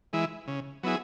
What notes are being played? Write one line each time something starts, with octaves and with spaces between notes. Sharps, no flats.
E3 G#3 E4
C#3
F#3 B3 E4 G#4